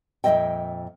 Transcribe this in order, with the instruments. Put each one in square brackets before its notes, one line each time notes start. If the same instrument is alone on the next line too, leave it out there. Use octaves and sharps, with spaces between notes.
[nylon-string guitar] F2 A#2 D#3 D#5 E5 G5